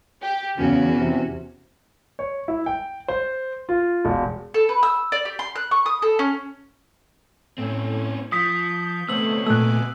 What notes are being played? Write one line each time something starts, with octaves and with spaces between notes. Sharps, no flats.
G4
E2 C#3 C#4 F#4
C3
C#5
E4
G5
C5
F4
E1
A4
B4
E6
D5
G4
C6
F#6
C#6
D#6
A4
C#4
A2 C4 C#4
F3 D#6 G6 B6
G6
C3 A3 B3 C5 C#5 E6 F#7
A#2 A3 G#5 D6 E6 F#6